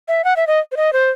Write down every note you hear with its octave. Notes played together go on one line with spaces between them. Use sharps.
E5
F#5
E5
D#5
C5
D#5
C5